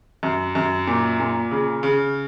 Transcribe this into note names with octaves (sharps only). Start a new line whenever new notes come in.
F#2
F#2
A#2
A#2
C#3
C#3